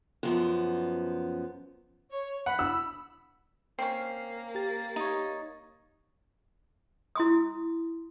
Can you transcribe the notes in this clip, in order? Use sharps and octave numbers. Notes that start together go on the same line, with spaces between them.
F#2 F3 B3
C#5
F#5 B5
E6
A#3 C4 C#4 C7
G4 A6
D#4 C#5
E4 C6 D#6